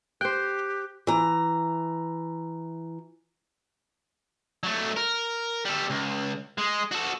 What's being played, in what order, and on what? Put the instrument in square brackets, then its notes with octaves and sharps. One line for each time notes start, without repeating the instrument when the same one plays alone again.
[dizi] G4 [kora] C5 G5 [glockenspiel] F#6
[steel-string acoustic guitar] E3 A#5
[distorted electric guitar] F#3 A3
A#4
G3 A4
C#2
G#3
F#4 A4